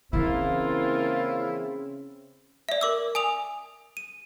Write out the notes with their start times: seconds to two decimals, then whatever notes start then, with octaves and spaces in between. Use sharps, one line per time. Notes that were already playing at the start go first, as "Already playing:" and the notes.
0.13 C#3 E3 A#3 C4 E4 F4
2.69 D5 E5
2.81 A#4 D6 E6
3.15 G#5 D#6 F7
3.97 D#7